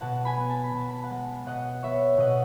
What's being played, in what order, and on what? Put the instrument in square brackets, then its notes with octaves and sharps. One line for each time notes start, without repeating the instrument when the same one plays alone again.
[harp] B2 F#5 A5
G#5 B5
B3
A5
B5
B2 A5
B5
F#5 A5
G#3
B2 D#5 F#5
B3 C#5 E5
B2 D#5 F#5